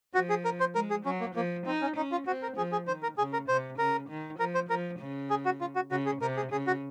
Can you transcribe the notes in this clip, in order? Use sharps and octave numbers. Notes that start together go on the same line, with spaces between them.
F3 F#4
G#4
A#4
C5
G#3 A#4
G#4
F#3 C#4
A#3
F3 A#3
C4 D#4
C#4
C#4 D#4
F4
C4 F#4
A#4
F3 G#4
G#4
D#3 C5
A#4
C#3 G#4
A#4
C3 C5
C#3 A#4
D#3
F3 A#4
C5
F3 A#4
C#3
G#4
F#4
F4
F#4
C#3 F#4
G#4
C3 A#4
G#4
C#3 G#4
F#4